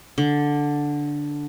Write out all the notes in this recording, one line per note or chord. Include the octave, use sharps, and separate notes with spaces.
D3